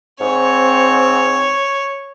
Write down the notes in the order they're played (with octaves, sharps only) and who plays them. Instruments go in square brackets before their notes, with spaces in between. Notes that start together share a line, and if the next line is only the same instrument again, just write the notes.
[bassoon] G#2 [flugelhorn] C4 [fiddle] C#5